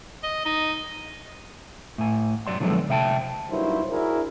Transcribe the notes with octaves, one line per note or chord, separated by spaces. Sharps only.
D#5
D#4
A2 G#5
F#2 F#3 D5 C6
D3 F3 F#3 G#3 B3 A4
C3 E5 G5 A5
G2 F#3 A#3 D#4 E4 C5
D4 E4 F#4 G#4 A#4